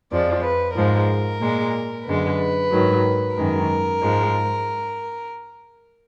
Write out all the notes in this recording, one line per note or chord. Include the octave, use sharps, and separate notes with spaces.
F2 F3 G#3 D5
B4
G#2 F3 G#3 A#4
A#2 G#3
F#2 D3 G#3 B4
G#2 D#3 F#3
F#2 D#3 G#3 A#4
G#2 F3 G#3